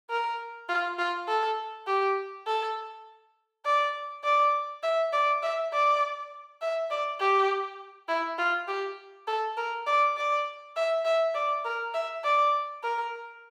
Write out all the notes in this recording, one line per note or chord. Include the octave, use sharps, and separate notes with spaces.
A#4
F4
F4
A4
G4
A4
D5
D5
E5
D5
E5
D5
E5
D5
G4
E4
F4
G4
A4
A#4
D5
D5
E5
E5
D5
A#4
E5
D5
A#4